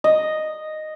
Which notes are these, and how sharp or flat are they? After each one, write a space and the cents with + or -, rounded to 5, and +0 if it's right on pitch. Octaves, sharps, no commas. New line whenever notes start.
D#5 -5